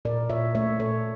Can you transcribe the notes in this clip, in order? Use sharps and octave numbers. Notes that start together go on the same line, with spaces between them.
A#2 A#4 D5
A#2 C#5 E5
A3 C#5 E5
A#2 A4 C#5